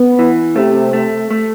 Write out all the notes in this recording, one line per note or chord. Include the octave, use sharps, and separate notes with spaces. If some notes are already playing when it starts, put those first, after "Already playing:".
Already playing: B3
E3
C3 A3
A3
A3